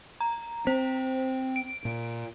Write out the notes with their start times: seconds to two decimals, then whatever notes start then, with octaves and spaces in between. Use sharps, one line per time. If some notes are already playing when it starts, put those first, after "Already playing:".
0.21 A#5
0.67 C4 C5
1.56 D7
1.85 A#2